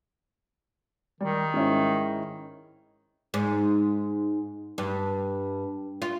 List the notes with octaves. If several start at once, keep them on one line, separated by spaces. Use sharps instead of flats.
D#3 G3
G#2 C#4 E4
G#2
G2
F4